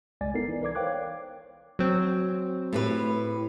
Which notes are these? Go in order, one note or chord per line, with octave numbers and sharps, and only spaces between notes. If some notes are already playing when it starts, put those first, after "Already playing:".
G1 C2 G#3 D5 G#5 A6
B3 D#4 E4 A4 A#4 C7
E3
A#4 B4 D5 D6 G#6
C5 C#5 F5 G5 D6 F#6
F#3 C4
A2 G4 B4